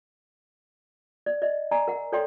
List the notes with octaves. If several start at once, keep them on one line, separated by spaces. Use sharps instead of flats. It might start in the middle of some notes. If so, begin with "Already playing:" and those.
D5
D5 D#5
D5 G#5 A#5
A#4 F#5
A4 C#5 D5 G5 C6